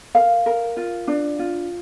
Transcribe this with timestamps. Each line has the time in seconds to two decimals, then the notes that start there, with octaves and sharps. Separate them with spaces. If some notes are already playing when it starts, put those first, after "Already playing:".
0.15 A#4 F5
0.46 A#4
0.77 F4
1.07 D4
1.39 F4